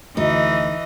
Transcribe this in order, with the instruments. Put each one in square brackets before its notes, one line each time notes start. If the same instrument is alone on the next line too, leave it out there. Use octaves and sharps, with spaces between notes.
[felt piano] D2 [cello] E3 [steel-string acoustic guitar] D#4 [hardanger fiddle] D#5